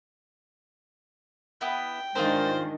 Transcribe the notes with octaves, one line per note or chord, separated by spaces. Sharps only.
B3 E4 G5
G#2 D#3 D4 F4 G#4 A#4 C5